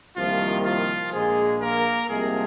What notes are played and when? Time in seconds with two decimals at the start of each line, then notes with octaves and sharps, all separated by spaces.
0.17 C2 C3 D#3 F3 A#3 F4
0.65 F3 F4
1.13 A#1 A#2 G#3 A#3 G#4
1.61 A#3 A#4
2.09 C2 C3 F3 G#3 A#3 G#4